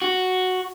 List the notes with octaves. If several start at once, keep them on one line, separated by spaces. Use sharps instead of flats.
F#4